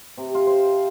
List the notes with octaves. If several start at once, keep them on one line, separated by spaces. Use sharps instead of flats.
C3
F4
C5